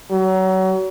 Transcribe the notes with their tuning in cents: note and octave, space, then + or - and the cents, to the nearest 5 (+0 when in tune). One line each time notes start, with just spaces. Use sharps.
F#3 +30